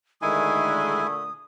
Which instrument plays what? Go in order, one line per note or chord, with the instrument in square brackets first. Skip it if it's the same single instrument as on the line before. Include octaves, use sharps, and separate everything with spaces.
[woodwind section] A#2 D3 A3 [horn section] D#3 G#3 [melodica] E4 G#5 [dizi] D#6